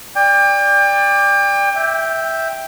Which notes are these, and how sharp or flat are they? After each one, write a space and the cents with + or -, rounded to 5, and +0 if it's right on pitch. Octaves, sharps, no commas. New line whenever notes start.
D5 +0 G5 +35
E5 -5 G5 +5